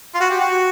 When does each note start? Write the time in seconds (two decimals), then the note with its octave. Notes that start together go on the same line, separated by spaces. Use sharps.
0.14 F4
0.20 F#4
0.30 G4
0.40 F#4